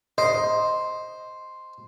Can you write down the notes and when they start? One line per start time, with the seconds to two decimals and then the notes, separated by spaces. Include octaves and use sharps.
0.18 C5 D#5